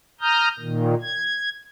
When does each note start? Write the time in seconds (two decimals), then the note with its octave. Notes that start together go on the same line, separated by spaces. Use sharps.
0.21 A#5 D#6 F6 G6
0.59 A#2 D#3
1.01 G#6